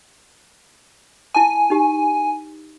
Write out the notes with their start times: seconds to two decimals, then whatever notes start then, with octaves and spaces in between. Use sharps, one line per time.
1.34 E4 G#5 A5 D6
1.70 D#4 G4